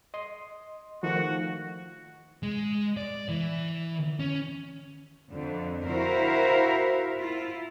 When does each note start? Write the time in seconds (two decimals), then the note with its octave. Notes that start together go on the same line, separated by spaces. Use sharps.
0.14 D#5 C6
1.03 D#3 F3 A3 F#4
2.43 G#3
2.97 D5
3.29 E3
4.19 C#4
5.31 F2 D3
5.85 E4 F#4 A#4 C5 E5 F5
7.19 E4 F4